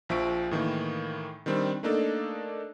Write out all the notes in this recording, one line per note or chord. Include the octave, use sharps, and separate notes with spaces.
A#1 F3 E5 C#6 D7
A2 D#3 E3 A#3
D#3 G3 C4 D4
A3 A#3 D4 D#4 A4